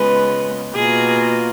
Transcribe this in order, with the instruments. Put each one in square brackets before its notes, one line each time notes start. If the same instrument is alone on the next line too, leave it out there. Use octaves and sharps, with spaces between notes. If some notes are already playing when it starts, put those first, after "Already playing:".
Already playing: [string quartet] C#3 G#3 B3 F4 B4
B2 A#3 F4 G#4